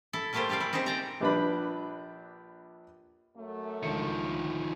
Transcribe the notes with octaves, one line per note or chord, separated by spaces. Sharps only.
E4 A4
G3 A3 A#3 F4 G4 C5
G3 G4 G#4 D5 F5
E4
C4 D#4 G4 G#4 C5
C5 D5 A#5
A#1 G3 D4 B4 D5 B5
F#2 A3
C#2 D3 D#3 F3 C#7